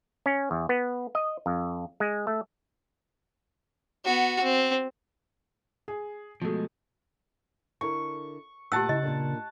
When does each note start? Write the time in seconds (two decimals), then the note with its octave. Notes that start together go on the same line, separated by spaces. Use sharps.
0.26 C#4
0.51 E2
0.69 B3
1.15 D#5
1.46 F2
2.00 G#3
2.27 A3
4.05 B3 F#4
4.44 C4
5.88 G#4
6.42 B2 F3 G#3 A3
7.81 D3 E4 A#4 C#6
8.72 D2 A#2 G4 F#5 A5 E6
8.89 C#3 D#4 E4 D#5
9.03 A#2 A#3 D4